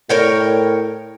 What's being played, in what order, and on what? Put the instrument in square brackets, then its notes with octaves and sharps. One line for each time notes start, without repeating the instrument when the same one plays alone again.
[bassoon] A2 [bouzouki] A#4 C#5 G5